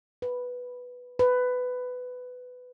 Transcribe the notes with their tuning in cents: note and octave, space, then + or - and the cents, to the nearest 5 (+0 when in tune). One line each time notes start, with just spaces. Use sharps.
B4 +0
B4 +15